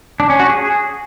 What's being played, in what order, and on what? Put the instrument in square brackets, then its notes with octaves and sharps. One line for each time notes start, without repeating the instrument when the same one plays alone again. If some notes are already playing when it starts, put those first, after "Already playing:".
[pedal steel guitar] D4
C#4
F#4
G#4